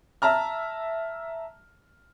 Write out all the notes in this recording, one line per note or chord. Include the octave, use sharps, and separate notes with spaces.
E5 A5 A#5 F6